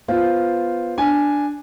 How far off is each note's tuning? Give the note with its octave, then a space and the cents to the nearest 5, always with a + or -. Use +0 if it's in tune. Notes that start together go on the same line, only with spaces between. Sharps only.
B3 +0 F4 +0 C5 +0
D4 +0 G#5 +0